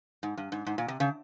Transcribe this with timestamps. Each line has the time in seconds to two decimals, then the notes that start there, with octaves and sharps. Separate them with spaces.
0.23 G#2
0.37 G2
0.52 G#2
0.66 G#2
0.78 A#2
0.88 C3
1.00 C#3